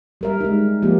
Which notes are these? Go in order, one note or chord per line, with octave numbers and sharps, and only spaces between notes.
G3 A#4 E5
G#3 D#4
F3 A#3 G4